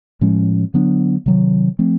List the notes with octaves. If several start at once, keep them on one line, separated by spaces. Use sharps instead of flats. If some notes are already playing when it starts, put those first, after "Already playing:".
A2 F3 G#3 C#4
D3 F#3 B3 D4
C3 D#3 F#3
F3 A3 C4